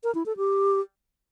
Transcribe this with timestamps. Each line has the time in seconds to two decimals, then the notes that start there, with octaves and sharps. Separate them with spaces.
0.04 A#4
0.15 E4
0.26 A4
0.37 G4